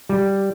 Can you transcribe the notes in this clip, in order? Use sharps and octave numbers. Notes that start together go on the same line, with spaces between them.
G3